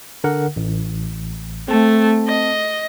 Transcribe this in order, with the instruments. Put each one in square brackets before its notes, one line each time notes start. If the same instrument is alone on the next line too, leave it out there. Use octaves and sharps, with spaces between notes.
[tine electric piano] D3 A#4 F#5
A1
[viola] A3 [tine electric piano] C4 A5
[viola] D#5